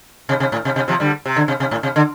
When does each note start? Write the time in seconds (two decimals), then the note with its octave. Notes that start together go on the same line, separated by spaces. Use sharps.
0.29 C3
0.40 C3
0.52 A2
0.65 C3
0.76 C3
0.88 C3 F3
1.00 D3 G3
1.26 C3
1.36 D3
1.48 C3
1.60 C3
1.71 A2
1.83 C3
1.96 D3